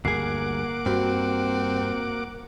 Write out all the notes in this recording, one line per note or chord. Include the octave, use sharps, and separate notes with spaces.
D2 G2 A#3 G#4 F#5 D6 C7
G2 C4 F#4